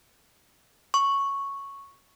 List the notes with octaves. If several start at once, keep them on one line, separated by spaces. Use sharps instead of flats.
C#6